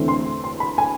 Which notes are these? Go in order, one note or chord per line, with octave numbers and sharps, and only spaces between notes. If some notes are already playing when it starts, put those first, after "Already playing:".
Already playing: E2 D3 A3 C4
C6
C6
B5
G#5